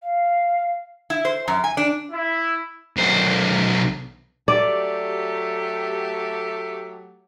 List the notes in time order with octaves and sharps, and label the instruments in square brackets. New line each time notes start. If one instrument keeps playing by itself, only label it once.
[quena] F5
[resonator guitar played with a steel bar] E4
C5
F#2
G#5
D4
[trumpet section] E4
[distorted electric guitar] B1 C5
[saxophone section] F#3 A3 G4 [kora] D5